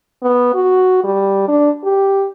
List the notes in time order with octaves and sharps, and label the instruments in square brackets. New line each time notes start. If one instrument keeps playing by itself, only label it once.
[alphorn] B3
F#4
G3
D4
G4